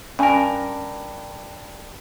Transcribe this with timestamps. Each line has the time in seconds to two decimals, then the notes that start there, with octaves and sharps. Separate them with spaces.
0.19 G2 C#4 A#4 G#5